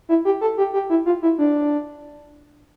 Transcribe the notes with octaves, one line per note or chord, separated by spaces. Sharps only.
E4
G4
A4
G4
G4
E4
F4
E4
D4